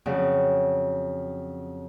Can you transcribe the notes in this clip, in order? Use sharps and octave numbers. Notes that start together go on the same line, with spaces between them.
F2 C#3 F#3